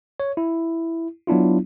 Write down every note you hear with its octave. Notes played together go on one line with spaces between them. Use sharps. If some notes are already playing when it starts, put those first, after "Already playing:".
C#5
E4
F#3 B3 D4 E4 F4